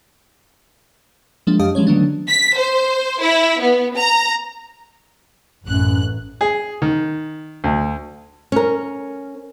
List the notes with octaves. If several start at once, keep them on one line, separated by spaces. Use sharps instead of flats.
F3 G#3 A#3 D4
F#2 G4 D#5 F5 A5 D#6
E3 F3 G#3 C#4 C#5
D3 D#3 F#3 A3 B3 D4
B6
C5
E4
B3
A#5
A1 F#2 F#6
G#4
D#3
D2
C#4 A#4